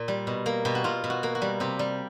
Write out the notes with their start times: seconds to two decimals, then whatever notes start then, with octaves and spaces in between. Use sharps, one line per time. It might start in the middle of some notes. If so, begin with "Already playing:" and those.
Already playing: A#2
0.08 G3
0.27 B2
0.46 A#3
0.65 B2 G4
0.75 F#4
0.84 B2 F4
1.04 B2
1.10 F#4
1.23 A#3
1.35 F#4
1.42 G3
1.60 C3 G4
1.79 G3